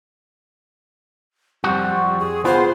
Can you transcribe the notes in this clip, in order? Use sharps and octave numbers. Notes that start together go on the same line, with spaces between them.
F2 G3 C4 F#4
G#4
B3 F4 G#4 C5